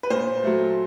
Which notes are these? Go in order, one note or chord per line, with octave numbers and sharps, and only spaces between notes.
B4
A#2 C5
F#3 A3